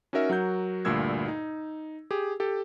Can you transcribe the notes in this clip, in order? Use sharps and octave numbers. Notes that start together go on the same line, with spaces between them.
C#4 D#4 F#4 A#4 E5
F#3 F#4 A#4 G6
D2 G2 A#2 E6 G#6
D#4
G4 G#4
G4 A4